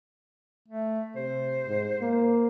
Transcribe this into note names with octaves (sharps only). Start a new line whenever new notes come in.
A3
C3 C5
G#2
A#3